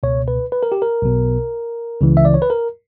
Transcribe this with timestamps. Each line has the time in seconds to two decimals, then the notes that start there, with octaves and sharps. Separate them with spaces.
0.03 C#2 B2 C#5
0.28 B4
0.52 B4
0.63 A#4
0.72 G4
0.82 A#4
1.02 B1 B2
2.01 C#2 C#3 E3
2.17 E5
2.25 D5
2.34 C#5
2.42 B4
2.50 A#4